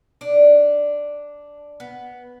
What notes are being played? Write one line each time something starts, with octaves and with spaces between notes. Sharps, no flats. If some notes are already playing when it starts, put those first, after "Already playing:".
D4
B3